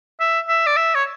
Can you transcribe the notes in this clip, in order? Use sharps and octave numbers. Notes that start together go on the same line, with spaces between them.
E5
E5
D5
E5
C#5